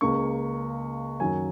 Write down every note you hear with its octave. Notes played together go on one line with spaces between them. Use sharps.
C#2 C#3 A#3 C#6
F#2 D#3 F#3 G#5